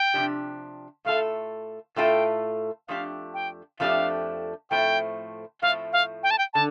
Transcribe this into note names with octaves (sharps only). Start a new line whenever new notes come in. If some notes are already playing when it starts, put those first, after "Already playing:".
Already playing: G5
C3 F3 D4 G4
A2 A3 F4 A4 F5
A2 A3 F4 A4 G5
F2 F3 A3 D4 G4 F5
G5
F2 F3 A3 D4 G4 F5
A2 F3 A3 C4 G5
A2 F3 A3 C4 F5
F5
G5
A5
G5
D3 A5